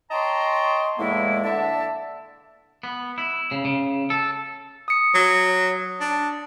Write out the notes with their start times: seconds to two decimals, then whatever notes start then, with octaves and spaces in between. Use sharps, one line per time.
0.11 C#5 D#5 G5 A5 A#5 C6
0.98 E2 A2 G#3 A#3 B3 E4
1.44 D3 E5 A5
2.83 B3
3.18 E4
3.51 C#3
3.65 C#3
4.10 A4
4.88 D#6 C#7
5.15 F#3
6.00 D4